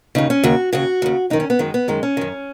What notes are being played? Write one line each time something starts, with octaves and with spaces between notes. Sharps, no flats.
D#2 C#3 D#4
C#4
D#2 C#3 F#4
D#2 C#3 F#4
D#2 C#3
F#2 D#3 D#4
C#4
B3
F#2 D#3 G#3
B3
F#2 D#3 G#3
C#4
F#2 D#3